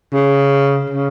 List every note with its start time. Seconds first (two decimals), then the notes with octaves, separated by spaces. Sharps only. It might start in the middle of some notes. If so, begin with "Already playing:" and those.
0.13 C#3
0.90 C#3